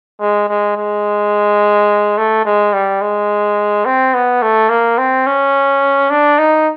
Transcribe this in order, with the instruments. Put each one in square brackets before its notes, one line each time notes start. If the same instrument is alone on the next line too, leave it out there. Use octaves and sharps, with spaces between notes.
[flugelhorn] G#3
G#3
G#3
A3
G#3
G3
G#3
C4
B3
A3
A#3
C4
C#4
D4
D#4